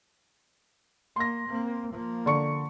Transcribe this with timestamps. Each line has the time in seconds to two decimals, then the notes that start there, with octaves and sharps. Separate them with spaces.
1.16 A#3 C6 A#6
1.48 A#3 C4
1.93 F3 A#3
2.26 D3 C#6 C#7